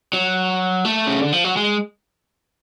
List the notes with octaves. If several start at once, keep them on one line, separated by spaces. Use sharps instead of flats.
F#3
A3
C#3
D3
F3
F#3
G#3